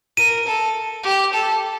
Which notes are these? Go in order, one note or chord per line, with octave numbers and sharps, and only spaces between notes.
A#4 D#7
A4
G4
A4